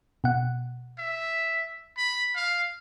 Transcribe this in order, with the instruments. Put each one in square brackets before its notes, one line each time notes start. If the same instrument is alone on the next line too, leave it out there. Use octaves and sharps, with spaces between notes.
[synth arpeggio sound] B2 F#5
[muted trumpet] E5
B5
F5